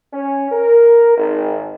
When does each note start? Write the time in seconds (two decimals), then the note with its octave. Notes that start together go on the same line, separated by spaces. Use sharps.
0.13 C#4
0.52 A#4
1.18 G#1